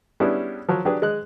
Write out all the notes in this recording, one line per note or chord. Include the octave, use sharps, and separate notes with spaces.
G3 B3 C#4 D4 E4 G#4
F3 F#3
F#3 D4 G4 G#4 B4
G#3 D#5 F#6